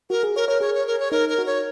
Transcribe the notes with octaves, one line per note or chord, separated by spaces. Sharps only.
F#4 A#4
G#4
A#4 C#5
A#4 C#5
G#4 C#5
C#5
A#4
C#5
D#4 A#4
A#4
F#4
C#5